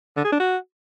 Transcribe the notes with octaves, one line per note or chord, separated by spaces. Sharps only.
D3
G#4
D4
F#4